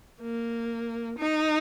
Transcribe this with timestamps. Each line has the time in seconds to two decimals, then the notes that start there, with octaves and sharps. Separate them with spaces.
0.21 A#3
1.18 D#4